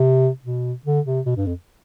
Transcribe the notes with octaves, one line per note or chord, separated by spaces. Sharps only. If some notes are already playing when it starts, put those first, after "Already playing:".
Already playing: C3
B2
D3
C3
B2
G2
F2